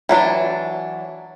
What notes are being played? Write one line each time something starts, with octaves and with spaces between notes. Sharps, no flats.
E3 F#3 D4